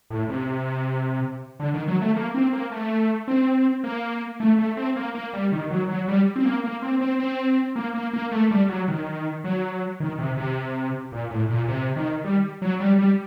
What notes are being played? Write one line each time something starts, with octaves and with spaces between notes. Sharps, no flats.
A2
C3
D3
D#3
F#3
A3
A#3
C4
A#3
A3
C4
A#3
A3
A3
C4
A#3
A#3
G3
D#3
F#3
F#3
G3
C4
A#3
A#3
C4
C4
C4
A#3
A#3
A#3
A3
G3
F#3
D#3
F#3
D#3
C3
C3
A#2
A2
A#2
C3
D#3
G3
F#3
G3
G3